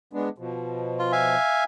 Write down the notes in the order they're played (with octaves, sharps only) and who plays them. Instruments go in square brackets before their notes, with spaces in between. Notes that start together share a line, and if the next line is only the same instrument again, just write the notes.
[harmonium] G#3 B3 D4
B2 F3
[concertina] F4
E5 F5 G#5